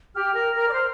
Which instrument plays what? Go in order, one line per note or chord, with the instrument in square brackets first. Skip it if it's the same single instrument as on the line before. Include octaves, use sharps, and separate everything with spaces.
[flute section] G4 [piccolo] F6
[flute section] A#4
A#4
D5
C5